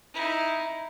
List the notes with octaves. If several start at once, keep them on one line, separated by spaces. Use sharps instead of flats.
D#4 E4